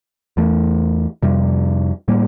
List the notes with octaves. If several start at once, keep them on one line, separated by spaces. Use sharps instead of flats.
E2 E3 A3
F2 C3 G3
A2 G3 A#3